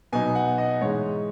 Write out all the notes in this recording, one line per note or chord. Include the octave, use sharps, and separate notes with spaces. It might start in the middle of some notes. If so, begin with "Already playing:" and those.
B2 F#3 B3 D#4 G#5
F#5
D#5
G#2 E3 G#3 D#4 C#5